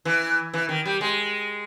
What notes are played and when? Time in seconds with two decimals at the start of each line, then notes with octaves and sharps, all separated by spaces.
0.05 E3
0.54 E3
0.69 D#3
0.85 G3
1.01 G#3